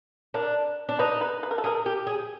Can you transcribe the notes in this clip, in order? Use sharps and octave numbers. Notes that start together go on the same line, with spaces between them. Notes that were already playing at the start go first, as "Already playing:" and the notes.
D4 A#4
D4
D#4 B4
B4
B4
A#4
A4
G#4 A#4
G4
G#4